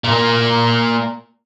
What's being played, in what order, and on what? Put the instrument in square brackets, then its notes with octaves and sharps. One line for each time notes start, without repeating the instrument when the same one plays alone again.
[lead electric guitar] A#2 A#3